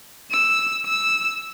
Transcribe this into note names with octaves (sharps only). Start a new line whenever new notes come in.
E6
E6